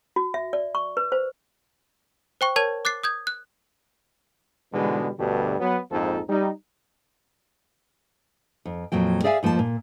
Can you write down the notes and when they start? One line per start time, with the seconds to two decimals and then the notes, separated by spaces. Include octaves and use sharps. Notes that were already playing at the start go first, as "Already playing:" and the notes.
0.16 F#4
0.34 E5
0.53 D5
0.75 C#6
0.97 B4
1.12 C5
2.41 C5 G5 C#6
2.56 A#4 C#5 A5 G#6
2.85 D6 F#6 A6 C7
3.03 D#6 G6 G#6
3.27 F#6
4.73 G#2 B2 D3 E3 G3 G#3
5.18 D2 G2 B2 D3 G3
5.59 F#3 B3
5.91 A#1 F2 G#2 F3 D#4 A4
6.29 G3 D#4
8.65 F2
8.92 F2 A#2 F#3 G5
9.24 G#4 D5 E5 F5 G5 G#5
9.43 F2 F3 A#3 G4 A5
9.59 A#2